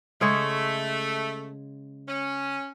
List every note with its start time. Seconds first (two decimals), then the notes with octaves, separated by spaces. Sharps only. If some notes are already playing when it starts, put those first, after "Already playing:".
0.21 C#3 G#3 A3 C#5
2.08 C#4